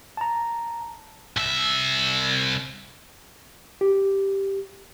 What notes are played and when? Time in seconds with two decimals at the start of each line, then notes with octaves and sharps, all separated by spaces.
0.17 A5 A#5
1.37 C2 E5
3.81 G4